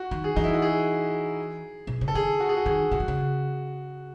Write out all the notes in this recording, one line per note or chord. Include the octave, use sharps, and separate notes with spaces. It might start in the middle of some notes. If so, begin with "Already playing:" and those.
Already playing: F#4
D#3
G#4
E3 D#4
E4
F#4
G#4
B2
C#3
A4
D#3 G#4
F#4
G#4
F#4
D#3 G#4
C#3 F#4
D#3
C#3